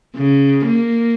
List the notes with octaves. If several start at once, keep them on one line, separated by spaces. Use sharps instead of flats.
C#3
A#3